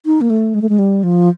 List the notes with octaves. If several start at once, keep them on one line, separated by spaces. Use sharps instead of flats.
D#4
A#3
A3
G#3
A3
G#3
G3
F3